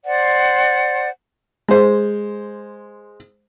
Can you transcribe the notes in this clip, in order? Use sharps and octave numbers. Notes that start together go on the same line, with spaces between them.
C5 D5 F#5
G#3 C5